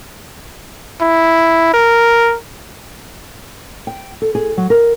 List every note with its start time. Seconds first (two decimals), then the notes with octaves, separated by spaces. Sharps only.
1.01 E4
1.74 A#4
3.87 G5
4.22 A4
4.35 G#4
4.57 F#3
4.70 A#4